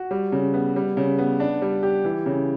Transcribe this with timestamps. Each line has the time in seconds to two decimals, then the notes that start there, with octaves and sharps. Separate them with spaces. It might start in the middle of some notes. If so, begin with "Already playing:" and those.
Already playing: F#4
0.11 G3
0.32 C#3
0.54 B3
0.76 G3
0.97 C#3
1.18 B3
1.40 D4
1.62 G3
1.83 G4
2.05 E3
2.26 C#3